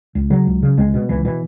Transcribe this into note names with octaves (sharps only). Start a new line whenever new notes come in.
C#2
C#3 F#3
C#2
C#3
C#2 G#3
B2
C#2 E3
B2 E3